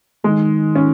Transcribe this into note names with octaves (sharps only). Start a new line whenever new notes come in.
D#3 G#3
C#4